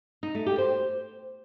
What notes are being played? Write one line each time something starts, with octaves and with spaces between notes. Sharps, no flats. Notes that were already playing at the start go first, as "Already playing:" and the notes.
D#4
A3
G4
C5